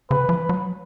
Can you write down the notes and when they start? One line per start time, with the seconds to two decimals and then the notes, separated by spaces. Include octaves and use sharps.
0.11 C#3 B4
0.29 F3
0.49 F#3